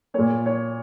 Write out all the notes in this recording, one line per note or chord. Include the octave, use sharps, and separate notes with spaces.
A#2 A#3 C#5
C#5